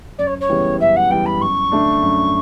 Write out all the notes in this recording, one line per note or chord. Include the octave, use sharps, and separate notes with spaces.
F#2 D5
C#5
C#5
C#3 E3 G3 B3
F#2 E5
F#5
C#3 E3 G3 B3 G5
B5
F#2 C#6
D3 A3 D4
F#2